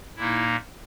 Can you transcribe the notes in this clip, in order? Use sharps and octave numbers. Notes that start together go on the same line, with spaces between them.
A#2 A#3 D#4 E4